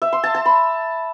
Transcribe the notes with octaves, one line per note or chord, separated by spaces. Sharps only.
E5
C6
A5
A5
B5